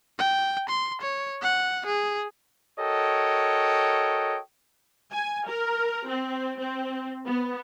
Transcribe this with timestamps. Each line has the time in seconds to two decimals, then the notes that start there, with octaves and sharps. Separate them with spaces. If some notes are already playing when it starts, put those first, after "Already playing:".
0.19 G5
0.69 C6
1.01 C#5
1.42 F#5
1.86 G#4
2.80 F#4 A4 A#4 C#5 D#5 G5
5.12 G#5
5.48 A#4
6.08 C4
6.59 C4
7.26 B3